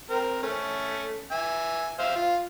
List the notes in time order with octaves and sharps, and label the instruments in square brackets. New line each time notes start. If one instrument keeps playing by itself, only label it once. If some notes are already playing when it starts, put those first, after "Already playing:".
[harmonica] C4 A#4
A3 C#4
E5 G#5
C5 E5 F5
F4